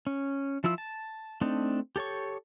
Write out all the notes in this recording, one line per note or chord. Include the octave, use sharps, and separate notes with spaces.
C#4
F3 E4 F4 E6
A5
A3 C4 D4 D#4
G4 A4 C#5 C#6